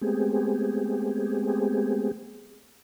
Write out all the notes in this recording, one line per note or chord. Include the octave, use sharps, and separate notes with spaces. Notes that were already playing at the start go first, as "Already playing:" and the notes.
G#3 A3 B3 C4 G4 G#4